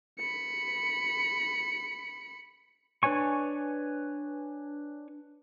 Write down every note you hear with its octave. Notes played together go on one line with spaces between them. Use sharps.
B5 C#7
D4 B4 C#5 G#5 C#6